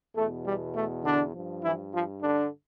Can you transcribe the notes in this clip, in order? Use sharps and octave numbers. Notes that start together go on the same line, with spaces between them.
E2 B2 A3
G3
A3
D3 D4
G2 F3
E3 E4
F3 F4
D3 D4